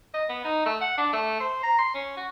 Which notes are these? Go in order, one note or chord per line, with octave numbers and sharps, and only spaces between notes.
D#5
B3
D#4
A3
F#5
D4
A3
C5
A#5
C6
C#4
F#4